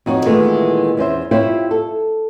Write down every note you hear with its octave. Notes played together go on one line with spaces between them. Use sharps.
F2 D#4 F#4 C#5
A#2 D#3 E3 G#3 A3 B3
E2 C#4 C5 E5
E4 F4 G4 C5 C#5 E5
A4